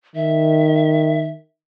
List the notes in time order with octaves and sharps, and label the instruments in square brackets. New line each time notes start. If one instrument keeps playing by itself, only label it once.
[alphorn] D#3 [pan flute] E5